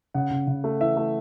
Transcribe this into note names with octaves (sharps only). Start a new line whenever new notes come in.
C#3 F#5
C#3
C#3
A3
E3 E5
A3